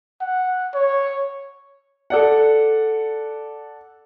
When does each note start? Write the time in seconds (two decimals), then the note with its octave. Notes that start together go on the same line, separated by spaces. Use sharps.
0.21 F#5
0.75 C#5
2.10 A4 D5 F#5